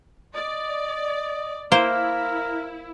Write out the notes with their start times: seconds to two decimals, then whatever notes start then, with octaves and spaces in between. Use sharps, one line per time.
0.35 D5 D#5
1.72 A#3 E4 A#4 C5